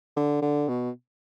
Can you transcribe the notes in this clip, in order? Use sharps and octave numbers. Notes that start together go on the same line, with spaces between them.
D3
D3
B2